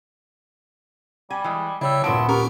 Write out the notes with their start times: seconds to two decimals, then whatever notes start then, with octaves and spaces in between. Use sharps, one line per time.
1.30 G3 G#5
1.44 E3 G#3
1.81 C#3 G3 E4 C#5 E6
2.04 D#1 F#3 A#3 B3 E4 A5 C6 D7
2.29 C#4 G4 A#4 C#6